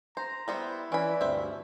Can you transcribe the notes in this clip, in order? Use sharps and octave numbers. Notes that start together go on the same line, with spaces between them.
C5 A#5
G3 B3 E4 C5
E3 C#4 D5 B5
D2 G2 C4 E5